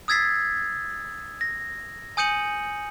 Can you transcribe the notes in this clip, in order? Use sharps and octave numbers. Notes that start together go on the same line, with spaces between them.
D#6 E6 G#6 A6 B6 C7
A#6
G#5 D#6 G6 C#7 D#7 F#7